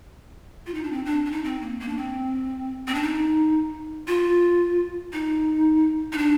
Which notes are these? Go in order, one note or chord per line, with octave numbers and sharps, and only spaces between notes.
F4
D#4
D4
C4
D4
D4
D#4
C4
A#3
A#3
D4
C4
C4
D4
D#4
F4
D#4
D#4
D4